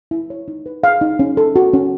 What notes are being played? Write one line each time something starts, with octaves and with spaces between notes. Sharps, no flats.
E4
C#5
D#4
B4
G#4 F5
D#4
C#4
A4
F#4
C#4